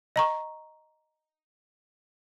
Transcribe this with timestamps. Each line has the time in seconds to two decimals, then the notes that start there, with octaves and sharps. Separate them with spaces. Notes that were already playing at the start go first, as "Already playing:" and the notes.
0.16 D#5 A#5 C#6